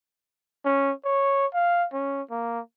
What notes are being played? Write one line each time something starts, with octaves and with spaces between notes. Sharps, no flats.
C#4
C#5
F5
C#4
A#3